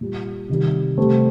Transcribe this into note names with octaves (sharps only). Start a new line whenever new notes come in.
A#2 G3
C3 D#3 G3
C3 G3 A3 C4